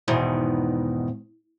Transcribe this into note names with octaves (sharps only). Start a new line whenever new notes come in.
E2 G#2 B2 D#3